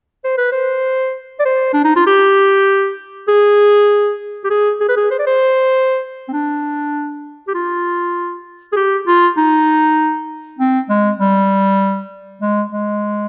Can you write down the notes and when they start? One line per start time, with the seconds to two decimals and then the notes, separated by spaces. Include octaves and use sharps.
0.24 C5
0.38 B4
0.52 C5
1.40 D5
1.45 C5
1.73 D4
1.84 D#4
1.96 F4
2.07 G4
3.28 G#4
4.44 G4
4.50 G#4
4.81 G#4
4.89 B4
4.97 G#4
5.11 C5
5.19 D5
5.27 C5
6.28 C4
6.33 D4
7.48 G4
7.55 F4
8.72 G#4
8.76 G4
9.07 F4
9.37 D#4
10.59 C4
10.89 G#3
11.20 G3
12.42 G#3
12.72 G#3